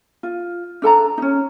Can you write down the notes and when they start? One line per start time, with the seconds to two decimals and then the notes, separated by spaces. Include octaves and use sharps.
0.23 F4
0.82 D4 A4 A5 A#5
1.18 C#4 D#4